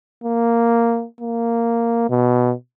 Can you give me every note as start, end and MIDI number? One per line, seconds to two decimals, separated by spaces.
0.23 1.05 58
1.21 2.09 58
2.10 2.53 47